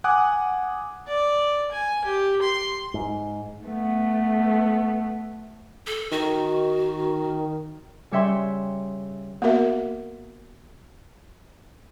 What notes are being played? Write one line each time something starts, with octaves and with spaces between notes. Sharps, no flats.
F#5 G#5 D6 D#6 F#6
D5
G#5
G4
C6
G#2
A3 B3
A4
D#3 F#4
C#3 G3 C#5 E5 G5 C6
A#3 B3 F#4 A#4 E5